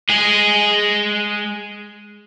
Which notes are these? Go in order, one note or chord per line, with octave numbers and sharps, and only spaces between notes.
G#3 G#4